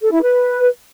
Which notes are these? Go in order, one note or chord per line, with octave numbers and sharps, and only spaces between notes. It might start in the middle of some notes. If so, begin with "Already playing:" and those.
A4
E4
B4